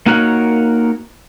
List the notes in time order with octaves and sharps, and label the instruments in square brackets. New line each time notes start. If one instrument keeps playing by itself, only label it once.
[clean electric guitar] A#3 D#4 F#4 A#4 C#5 F#5